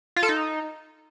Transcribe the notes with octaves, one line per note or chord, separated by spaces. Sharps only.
F4
A4
D#4